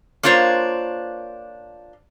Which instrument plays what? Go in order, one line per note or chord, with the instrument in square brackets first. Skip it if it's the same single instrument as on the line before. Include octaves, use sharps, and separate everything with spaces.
[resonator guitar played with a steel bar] A#3 D4 F4 C5 C#5